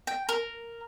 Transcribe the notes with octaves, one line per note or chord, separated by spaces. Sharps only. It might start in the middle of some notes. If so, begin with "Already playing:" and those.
G5
A#4